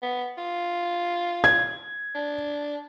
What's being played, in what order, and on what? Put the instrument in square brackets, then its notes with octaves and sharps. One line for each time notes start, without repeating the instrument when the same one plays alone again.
[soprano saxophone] B3
F4
[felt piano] G#6
[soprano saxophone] D4